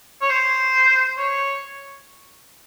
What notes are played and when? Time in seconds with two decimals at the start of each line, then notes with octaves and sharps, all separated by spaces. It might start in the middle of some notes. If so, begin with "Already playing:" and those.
0.21 C#5
0.30 C5
1.18 C#5